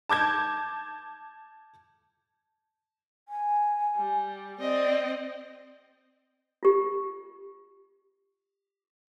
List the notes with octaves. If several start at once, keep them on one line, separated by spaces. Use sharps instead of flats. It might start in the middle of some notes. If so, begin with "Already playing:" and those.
A5 D6 G6 G#6
G#5
G3
C4 D5 D#5
F4 G4